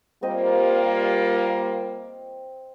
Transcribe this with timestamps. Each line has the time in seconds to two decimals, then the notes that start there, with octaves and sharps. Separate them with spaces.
0.22 G3 A#3 C4 F4 C5 D#5